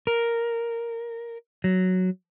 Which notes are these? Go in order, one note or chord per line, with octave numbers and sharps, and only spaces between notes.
A#4
F#3